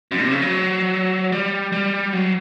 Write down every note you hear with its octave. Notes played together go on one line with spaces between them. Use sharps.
F#2
C3
C#3
F#3
G3
G3
F#3